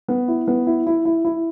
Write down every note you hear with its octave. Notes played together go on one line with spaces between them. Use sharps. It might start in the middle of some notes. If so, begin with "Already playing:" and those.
B3
E4
B3
E4
E4
E4
E4